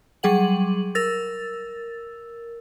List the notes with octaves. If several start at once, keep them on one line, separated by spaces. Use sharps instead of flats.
F#3 G3 G#4 F#5 F#7
A#4 E6 A6